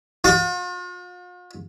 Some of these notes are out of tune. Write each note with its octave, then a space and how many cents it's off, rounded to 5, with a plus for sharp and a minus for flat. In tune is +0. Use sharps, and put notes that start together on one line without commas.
F4 +45